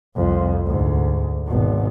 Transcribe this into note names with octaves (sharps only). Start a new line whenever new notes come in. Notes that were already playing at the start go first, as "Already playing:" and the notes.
C2 F2
D2 G#2
G#1 B2